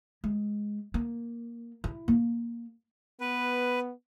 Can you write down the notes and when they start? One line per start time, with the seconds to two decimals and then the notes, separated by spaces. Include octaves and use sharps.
0.24 G#3
0.94 A#3
1.84 E4
2.08 A#3
3.20 B3 B4